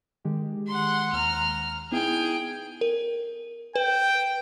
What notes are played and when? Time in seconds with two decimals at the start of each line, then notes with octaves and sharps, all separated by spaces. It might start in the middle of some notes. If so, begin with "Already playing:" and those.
0.25 D#3 G#3 G4
0.67 F#5 C6
1.12 D#2 A#5 F6
1.92 B3 D#4 E4 G#4 G5
2.81 A#4
3.76 B4 G5